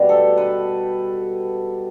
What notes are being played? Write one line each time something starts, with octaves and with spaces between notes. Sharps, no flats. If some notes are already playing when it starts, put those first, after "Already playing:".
Already playing: B2 G3 G4
A4
B4